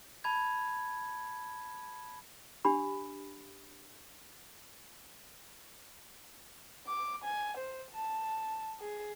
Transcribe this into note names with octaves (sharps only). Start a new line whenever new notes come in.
A5 B5 G#6
D4 G4 B5
D6
G#5
C5
A5
G#4